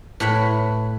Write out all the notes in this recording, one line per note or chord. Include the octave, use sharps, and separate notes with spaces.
A2 B4 C#5 B5